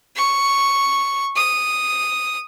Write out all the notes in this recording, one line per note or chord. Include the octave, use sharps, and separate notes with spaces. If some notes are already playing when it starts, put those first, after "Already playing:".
C#6
D#6